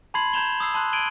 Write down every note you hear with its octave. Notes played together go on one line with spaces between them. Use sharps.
A5 B5 C6 G#6 C7 F#7
A#5 G6 G#6 E7 F7 G7
D#6 E6 C7
A5 C6 F#6
G#6 D7 D#7 F#7 G7